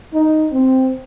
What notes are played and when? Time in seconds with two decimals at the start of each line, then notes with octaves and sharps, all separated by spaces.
0.14 D#4
0.52 C4